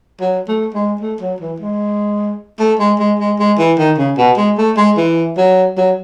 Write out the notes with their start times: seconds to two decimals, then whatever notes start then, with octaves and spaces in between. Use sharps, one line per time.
0.21 F#3
0.48 A3
0.74 G#3
1.01 A3
1.21 F#3
1.40 E3
1.60 G#3
2.59 A3
2.80 G#3
2.99 G#3
3.19 G#3
3.39 G#3
3.58 E3
3.79 D#3
3.98 C#3
4.17 B2
4.37 G#3
4.58 A3
4.77 G#3
4.97 E3
5.37 F#3
5.77 F#3